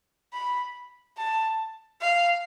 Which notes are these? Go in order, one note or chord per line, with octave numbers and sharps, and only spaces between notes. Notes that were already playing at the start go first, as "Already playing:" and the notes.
B5
A5
F5